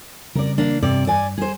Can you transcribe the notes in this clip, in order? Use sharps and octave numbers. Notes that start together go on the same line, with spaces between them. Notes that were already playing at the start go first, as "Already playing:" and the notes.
C#3 G3 C4 A#4 D5
A#3 D4
G2 C3 D5
D5 G#5
G3 G#4 C5